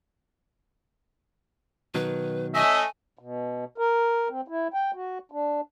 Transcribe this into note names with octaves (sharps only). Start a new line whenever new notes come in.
B2 D#3 F#3 B4
A3 C#4 D#5 E5 G#5
B2
A#4
C4
E4
G5
F#4
D4